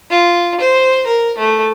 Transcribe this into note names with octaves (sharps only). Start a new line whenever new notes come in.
F4
C5
A#4
A3